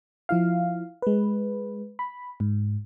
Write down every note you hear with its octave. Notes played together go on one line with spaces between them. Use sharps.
F3 E4 F5
G#3 B4
B5
G#2